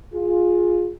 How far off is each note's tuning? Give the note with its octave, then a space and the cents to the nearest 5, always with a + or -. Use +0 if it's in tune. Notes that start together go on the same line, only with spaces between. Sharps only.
F4 +15 G#4 +0